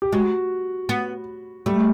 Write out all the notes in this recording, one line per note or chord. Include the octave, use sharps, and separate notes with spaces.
G4
G#3 F#4
B3
G3 A3 G4